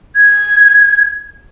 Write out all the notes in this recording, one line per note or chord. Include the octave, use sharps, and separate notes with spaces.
G#6